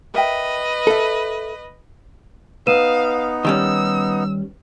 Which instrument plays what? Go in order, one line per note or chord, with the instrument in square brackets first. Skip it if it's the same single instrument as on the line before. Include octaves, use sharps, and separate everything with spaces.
[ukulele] A#4 E5 G5 [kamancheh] B4 D#5
[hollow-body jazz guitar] A4 E5 [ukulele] A#4
[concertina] B3 D#4 [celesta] B4 D#7 E7 [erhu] F5
[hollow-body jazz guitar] D#3 G3 C#4 [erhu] E6